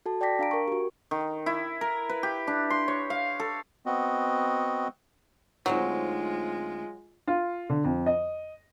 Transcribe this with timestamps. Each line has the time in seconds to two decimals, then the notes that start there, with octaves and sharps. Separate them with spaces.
0.06 F#4 A4 A5
0.21 D5 G5 A5 D6 A#6 B6
0.39 D4 F5 A#5 D7
0.51 A#4 C#6
0.68 F#4 G4
1.11 D#3
1.46 E4
1.81 A#4
2.09 B4
2.23 G4
2.47 D4
2.70 C6
2.88 C#5
3.10 F5
3.40 A4
3.86 B3 C4 F#4 D#5
5.66 D2 F#3 G#3 C4 D#4 F4
7.27 F4
7.69 D3
7.84 F2
8.06 D#5